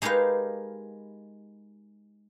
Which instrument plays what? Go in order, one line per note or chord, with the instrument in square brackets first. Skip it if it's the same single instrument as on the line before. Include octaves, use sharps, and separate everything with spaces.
[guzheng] G#3 D#4 G4 A#4 B4 F5